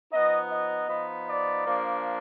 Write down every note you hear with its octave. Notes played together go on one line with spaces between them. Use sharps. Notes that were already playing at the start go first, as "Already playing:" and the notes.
F3 B3 D#4 D#5
D#5
F3 B3 D#4
D5
F3 A#3 D4